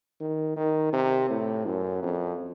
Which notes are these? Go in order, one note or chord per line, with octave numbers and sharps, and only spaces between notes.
D#3
D#3
C3
A2
F#2
F2